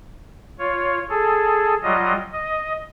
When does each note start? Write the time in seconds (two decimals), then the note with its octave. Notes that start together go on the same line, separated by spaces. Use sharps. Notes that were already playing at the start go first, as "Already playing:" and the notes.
0.59 F4 C#5
1.10 G#4 A4
1.83 F#3 G3 F4 D#5
2.33 D#5